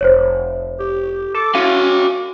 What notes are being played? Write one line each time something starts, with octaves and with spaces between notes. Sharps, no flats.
F1 C5 C#5
G4
A4 D6
C#4 F#4 F5 D#7